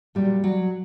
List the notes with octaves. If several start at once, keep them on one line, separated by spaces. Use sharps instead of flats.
A#2 F#3 G3
F#3